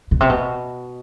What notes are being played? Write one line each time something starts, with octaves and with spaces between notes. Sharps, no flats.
B2
C3
B2